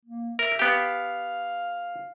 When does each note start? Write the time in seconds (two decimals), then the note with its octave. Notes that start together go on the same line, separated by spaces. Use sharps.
0.05 A#3
0.39 A#4 E5
0.59 B3 G4 F5